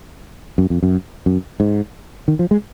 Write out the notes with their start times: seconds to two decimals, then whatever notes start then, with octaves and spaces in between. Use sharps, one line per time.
0.58 F#2
0.70 F2
0.83 F#2
1.26 F#2
1.60 G#2
2.28 D#3
2.39 F3
2.51 G#3